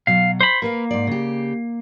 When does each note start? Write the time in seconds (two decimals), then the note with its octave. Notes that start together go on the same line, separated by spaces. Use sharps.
0.07 B2 F#3 F5
0.41 C5 B5
0.62 A#3 A#4 B4 F5
0.91 G#2 D5
1.07 C#3 G4